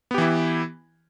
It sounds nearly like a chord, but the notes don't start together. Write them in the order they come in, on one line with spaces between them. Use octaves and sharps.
B3 G4 E3 E4